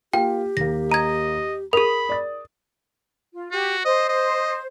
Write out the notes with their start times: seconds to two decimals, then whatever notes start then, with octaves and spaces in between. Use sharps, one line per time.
0.13 A#3 F4 G4 G5
0.57 D#2 A#3 A#6
0.92 D#5 A#5 G#6
1.73 G#4 A#4 B5 D#6
2.09 D5 A6
3.34 F4
3.51 F#4 G4
3.85 C5 D#5
4.09 D#5